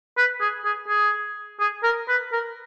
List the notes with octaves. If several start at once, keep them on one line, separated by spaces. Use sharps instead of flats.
B4
G#4
G#4
G#4
G#4
A#4
B4
A#4